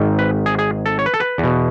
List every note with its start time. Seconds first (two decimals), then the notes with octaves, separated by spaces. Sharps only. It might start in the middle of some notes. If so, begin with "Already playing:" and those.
Already playing: G#1 G#2 D#3
0.19 B4
0.46 G#4
0.59 G#4
0.86 A4
0.99 C#5
1.06 B4
1.14 A4
1.20 B4
1.38 E2
1.44 B2